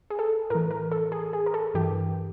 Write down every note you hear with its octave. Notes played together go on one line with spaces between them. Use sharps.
G#4
A4
A2 E3 A#4
A#4
A4
G#4
G#4
A#4
A4
G2 E3 G4